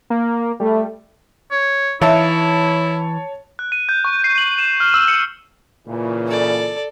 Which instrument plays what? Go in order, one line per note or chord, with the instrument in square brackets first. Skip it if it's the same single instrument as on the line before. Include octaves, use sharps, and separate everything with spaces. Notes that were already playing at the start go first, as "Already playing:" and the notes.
[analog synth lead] A#3
[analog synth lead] G3 [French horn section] A3
[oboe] C#5
[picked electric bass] E3 [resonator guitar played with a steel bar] D#4 E5 F5 [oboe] E4 [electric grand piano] C#5 A5
[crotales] F#6
D#7
G6
C#6
C7
F#7
E7
F6
E6
C#7
[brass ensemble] A#2 C#3 E3
[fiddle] A4 D5